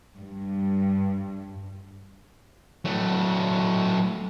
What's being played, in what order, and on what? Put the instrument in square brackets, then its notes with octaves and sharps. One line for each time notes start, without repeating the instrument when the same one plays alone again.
[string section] G2
[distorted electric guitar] F#3 A3